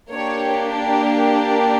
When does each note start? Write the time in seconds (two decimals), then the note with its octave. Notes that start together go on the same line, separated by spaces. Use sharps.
0.12 A#3 D4 G4 C#5